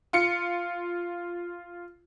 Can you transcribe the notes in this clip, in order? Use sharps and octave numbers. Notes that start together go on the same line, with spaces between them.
F4 C#7